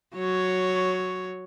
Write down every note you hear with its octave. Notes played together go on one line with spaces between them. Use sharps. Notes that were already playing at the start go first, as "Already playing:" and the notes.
F#3 C#5